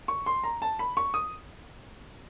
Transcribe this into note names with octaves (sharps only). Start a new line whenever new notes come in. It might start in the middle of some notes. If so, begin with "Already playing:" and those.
C#6
C6
A#5
A5
B5
C#6
D#6